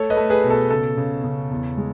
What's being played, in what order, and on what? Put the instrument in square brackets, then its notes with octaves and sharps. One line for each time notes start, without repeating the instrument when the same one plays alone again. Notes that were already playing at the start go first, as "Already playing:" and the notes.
Already playing: [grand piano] A3 A4 C#5
B4 D#5
A3
G#4 B4
B2 B4
A4
C#3 A4
C#3
C#3
E2
G#3